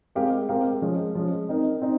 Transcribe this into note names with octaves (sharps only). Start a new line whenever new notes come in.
G#3 C4 G4 A#4 F5
G#3 C4 G4 A#4 F5
F3 G#3 C#4
F3 G#3 C#4
C4 D#4 A#4
C4 D#4